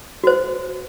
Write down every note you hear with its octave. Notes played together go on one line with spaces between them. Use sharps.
F#4 C5